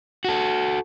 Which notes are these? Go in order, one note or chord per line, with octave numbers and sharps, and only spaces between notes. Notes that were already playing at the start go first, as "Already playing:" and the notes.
F#4 A4